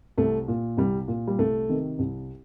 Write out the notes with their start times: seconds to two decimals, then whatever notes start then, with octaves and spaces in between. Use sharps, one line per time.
0.18 C2 A3
0.48 A#2
0.77 C2 G3
1.08 A#2
1.27 G3
1.38 C2 A3
1.69 C3 D#3
1.99 C2